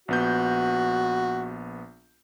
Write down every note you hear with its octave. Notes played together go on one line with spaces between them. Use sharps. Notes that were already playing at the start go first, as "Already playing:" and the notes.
A#1 B3 F#4 G6